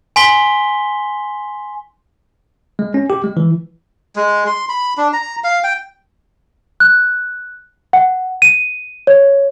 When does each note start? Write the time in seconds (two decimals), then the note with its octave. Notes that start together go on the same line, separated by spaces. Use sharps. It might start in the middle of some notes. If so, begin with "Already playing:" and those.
0.16 G#5 C6 B6 G7
2.79 G#3
2.94 C#4
3.10 G4
3.24 G#3
3.37 E3
4.16 G#3
4.47 C6
4.69 B5
4.97 D4
5.13 A#5
5.44 F5
5.64 G5
6.80 F#6
7.93 F#5
8.42 D#7
9.07 C#5